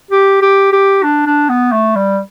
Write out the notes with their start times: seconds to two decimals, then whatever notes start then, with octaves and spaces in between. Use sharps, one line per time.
0.11 G4
0.42 G4
0.72 G4
1.03 D4
1.26 D4
1.49 B3
1.72 A3
1.96 G3